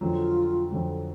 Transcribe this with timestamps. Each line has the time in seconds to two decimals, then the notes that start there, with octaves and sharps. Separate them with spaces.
0.01 F2 D3 F#3 F4
0.71 F2 D3 F#3